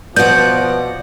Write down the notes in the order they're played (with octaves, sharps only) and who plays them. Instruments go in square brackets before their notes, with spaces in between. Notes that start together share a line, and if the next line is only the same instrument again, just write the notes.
[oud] B2 B3 [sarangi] F3 [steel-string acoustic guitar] D5 F#5 [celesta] G6